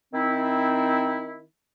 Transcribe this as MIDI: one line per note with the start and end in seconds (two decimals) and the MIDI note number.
0.13 1.43 51
0.13 1.43 60
0.13 1.43 63
0.13 1.43 64